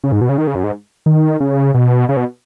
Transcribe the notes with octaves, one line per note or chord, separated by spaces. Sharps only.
C#3
G#2
B2
C#3
D#3
C#3
F#2
G#2
D#3
C#3
B2
C#3
B2